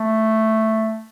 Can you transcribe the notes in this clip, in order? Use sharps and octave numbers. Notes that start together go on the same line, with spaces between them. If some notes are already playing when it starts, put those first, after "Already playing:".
Already playing: A3